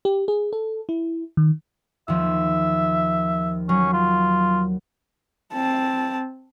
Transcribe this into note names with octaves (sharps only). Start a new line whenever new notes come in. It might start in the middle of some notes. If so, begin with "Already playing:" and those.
G4
G#4
A4
E4
D#3
D#2 F3 E5
F#3 C#4
F4
C4 A5